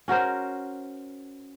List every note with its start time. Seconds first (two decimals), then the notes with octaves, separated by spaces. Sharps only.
0.08 C#4 F#4 A#4 C5